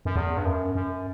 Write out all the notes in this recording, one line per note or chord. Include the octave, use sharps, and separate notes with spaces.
F#2
E2
G2
F#2
F#2